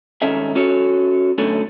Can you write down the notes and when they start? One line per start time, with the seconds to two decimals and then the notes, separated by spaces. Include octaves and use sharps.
0.22 C2 G#2 D#3 C#4 A4 E5
0.55 C#4 F#4 A4 C#5
1.38 F#2 B2 D3 A3 C#4